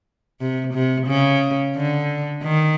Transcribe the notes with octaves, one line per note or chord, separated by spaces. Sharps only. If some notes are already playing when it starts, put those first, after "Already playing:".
C3
C3
C#3
D3
D#3